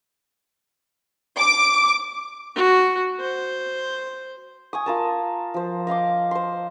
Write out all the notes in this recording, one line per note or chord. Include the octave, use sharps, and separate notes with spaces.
D6
F#4
C5
G#5 C#6 D#6
F4 A#4 A5
F3 C5
D#5 F5 C6 D6
C5 C6